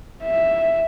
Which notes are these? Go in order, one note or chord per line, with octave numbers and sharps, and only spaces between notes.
E5